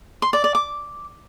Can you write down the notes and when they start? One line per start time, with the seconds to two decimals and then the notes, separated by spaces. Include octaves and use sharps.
0.22 C6
0.33 D5
0.44 D5
0.55 D6